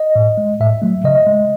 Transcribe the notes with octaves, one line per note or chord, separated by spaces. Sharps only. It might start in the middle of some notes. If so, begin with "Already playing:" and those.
Already playing: D#5
A2
G#3
A2 E5
F#3 A3
C#3 D#5
G#3